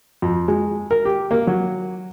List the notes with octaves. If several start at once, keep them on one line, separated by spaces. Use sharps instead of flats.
F2
G#3
A#4
G4
A#3
F#3